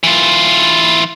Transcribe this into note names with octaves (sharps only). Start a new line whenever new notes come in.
E3 F4